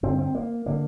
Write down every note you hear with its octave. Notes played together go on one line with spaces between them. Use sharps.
G2 D3 C4
C4
A#3
D3 A#3